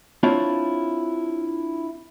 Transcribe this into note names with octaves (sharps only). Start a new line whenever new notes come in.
C4 D4 E4 F4 C#5